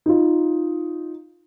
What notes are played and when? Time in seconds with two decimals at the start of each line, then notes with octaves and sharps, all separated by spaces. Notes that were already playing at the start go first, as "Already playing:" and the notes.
0.06 D#4 F4